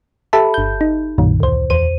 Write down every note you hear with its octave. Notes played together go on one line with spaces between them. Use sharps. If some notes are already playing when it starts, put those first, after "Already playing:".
G4 A4 E5 A5 B5
G1 G6
D#4
B1 F#2 A#2 D#3
D2 C5
E2 C5 D#7